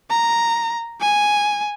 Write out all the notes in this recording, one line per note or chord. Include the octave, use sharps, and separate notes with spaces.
A#5
G#5